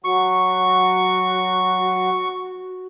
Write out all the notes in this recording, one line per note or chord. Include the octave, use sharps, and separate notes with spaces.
F#3 F#4 C#6